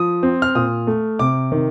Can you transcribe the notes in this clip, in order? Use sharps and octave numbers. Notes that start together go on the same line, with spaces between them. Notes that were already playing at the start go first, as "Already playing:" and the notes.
Already playing: F3 D#6
C4
F6
A#2 D#6
A3
C3 D6
D#3